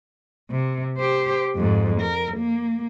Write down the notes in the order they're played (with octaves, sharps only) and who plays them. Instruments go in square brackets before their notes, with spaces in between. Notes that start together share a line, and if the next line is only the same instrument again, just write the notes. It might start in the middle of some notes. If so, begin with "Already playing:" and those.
[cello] C3
G4 C5
F2 G#2
A#4
A#3